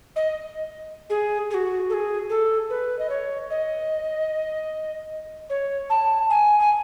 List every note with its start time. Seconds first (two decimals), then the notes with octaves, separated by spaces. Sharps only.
0.16 D#5
1.10 G#4
1.51 G#4
1.54 F#4
1.90 A4
1.93 G#4
2.30 A4
2.70 B4
2.99 D#5
3.10 C#5
3.51 D#5
5.50 C#5
5.90 A5
6.30 G#5
6.60 G#5